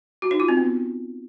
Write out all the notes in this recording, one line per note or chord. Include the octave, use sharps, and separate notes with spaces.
F#4
D#4
F4
C4
B3